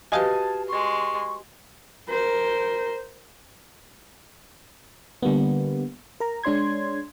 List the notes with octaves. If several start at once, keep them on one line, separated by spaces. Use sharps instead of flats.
F#4 G4 B4 D#5 F5 G#5 A5
G#3 C6 C#6
A#4 C5
D3 G3 A#3 B3
A#4 A#5
G#3 D4 C#5 C6 G#6